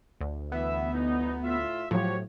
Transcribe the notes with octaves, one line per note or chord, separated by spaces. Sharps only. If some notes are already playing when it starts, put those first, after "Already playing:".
D2
E3 B3 E5
G1 E3 D#4
A2 F4 E5
A2 F3 F#3 F#4 G4 C#5